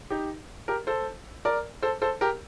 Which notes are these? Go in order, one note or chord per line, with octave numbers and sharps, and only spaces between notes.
D#4 G4
G4 A#4
A4 C5
A#4 D5
A4 C5
A4 C5
G4 A#4